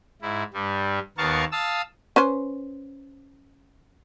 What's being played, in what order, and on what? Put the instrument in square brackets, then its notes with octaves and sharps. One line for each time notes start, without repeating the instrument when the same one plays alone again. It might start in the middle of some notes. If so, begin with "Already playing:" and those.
[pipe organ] G#2 E4
G2 G3
D#2 B3 A#4 F5 A5 C#6
F5 A5 D#6 E6
[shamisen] C#4 B4 C5